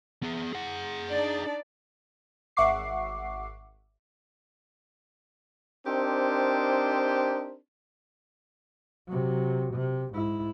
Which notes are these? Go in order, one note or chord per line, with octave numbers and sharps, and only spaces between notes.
B3 G#4
G#4 F#5
D4 D#4 D5
G#1 E5 F#5 C#6 D6 C7
C4 D4 D#4 G4 A#4 C5
C3 F#3
C3
G#2 E4